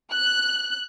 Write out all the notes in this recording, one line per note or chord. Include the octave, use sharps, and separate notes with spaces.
F#6